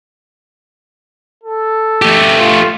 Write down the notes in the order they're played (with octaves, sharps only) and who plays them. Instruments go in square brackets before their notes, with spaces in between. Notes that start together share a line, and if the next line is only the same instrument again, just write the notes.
[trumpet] A4
[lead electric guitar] A3 G4
[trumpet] F4